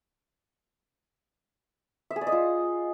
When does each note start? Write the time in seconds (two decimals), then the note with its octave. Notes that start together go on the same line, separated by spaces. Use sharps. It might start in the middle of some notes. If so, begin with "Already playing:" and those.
2.11 E5
2.16 G#4
2.21 D5
2.27 D#5
2.32 F4